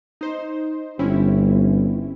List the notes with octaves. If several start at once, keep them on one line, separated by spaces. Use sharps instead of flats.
D#4 C5
G1 C4 C#4 E4